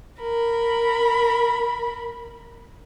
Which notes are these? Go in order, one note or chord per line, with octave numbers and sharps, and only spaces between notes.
A#4 B5